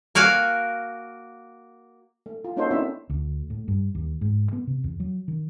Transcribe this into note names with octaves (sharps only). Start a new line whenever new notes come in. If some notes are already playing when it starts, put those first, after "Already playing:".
A#3 F#4 F5 G#5
A3
F4
A#3 C#4 D#4 F#4 A4 C5
B3 C4 D4 E4 C5 E5
D2
A2
G2
D#2
G#2
B3
C3
E2
F#3
D#3